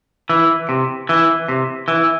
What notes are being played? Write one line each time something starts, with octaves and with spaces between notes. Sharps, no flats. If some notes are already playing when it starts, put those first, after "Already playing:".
E3
C3
E3
C3
E3